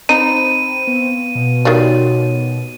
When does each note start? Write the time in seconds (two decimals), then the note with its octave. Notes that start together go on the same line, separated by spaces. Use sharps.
0.09 C4 D#4 B5 D#7
0.87 B3
1.35 B2
1.65 D#3 G3 F#4 C#5